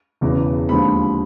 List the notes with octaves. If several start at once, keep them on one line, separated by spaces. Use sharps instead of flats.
E1 E2 C#3 E3
D#2 D3 F3 G#3 C4 B5